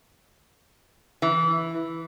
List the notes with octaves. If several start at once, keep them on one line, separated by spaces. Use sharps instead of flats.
E3